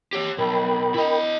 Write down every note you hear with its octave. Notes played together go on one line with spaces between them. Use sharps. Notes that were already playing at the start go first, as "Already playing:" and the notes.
G4 C#5
B1 A#4 G5 B5
E4 D#5